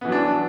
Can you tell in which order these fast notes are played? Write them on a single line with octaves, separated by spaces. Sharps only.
B3 E3 F#3 D4